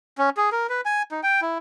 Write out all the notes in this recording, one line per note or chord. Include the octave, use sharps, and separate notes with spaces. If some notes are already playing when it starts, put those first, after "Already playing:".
C#4
G#4
A#4
B4
G#5
D#4
G5
E4